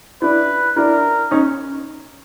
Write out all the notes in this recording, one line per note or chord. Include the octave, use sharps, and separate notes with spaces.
D4 E4 B4
D4 E4 A#4
C#4 D#4